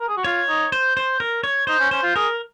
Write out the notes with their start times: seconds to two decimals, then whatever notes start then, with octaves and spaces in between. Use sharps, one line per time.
0.01 A#4
0.09 G#4
0.17 F#4
0.24 F4 C#5
0.49 D#4
0.72 C5
0.97 C5
1.20 A#4
1.44 C#5
1.67 D#4 C5
1.80 C#4
1.91 C#4 C5
2.03 F4
2.16 G#4 A#4